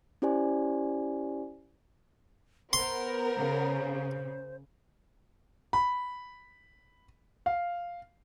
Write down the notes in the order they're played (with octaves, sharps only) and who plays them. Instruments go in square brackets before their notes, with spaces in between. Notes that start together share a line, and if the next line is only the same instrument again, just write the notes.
[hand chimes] C#4 E4 G4 C5 D5 G#5
[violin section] B3 A#4 [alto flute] C5 [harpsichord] C6
[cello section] C#3
[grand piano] B5
F5